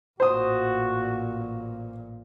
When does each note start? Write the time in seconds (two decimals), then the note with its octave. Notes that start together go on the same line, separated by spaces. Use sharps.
0.20 A1 A#2 F#4 C5 D#6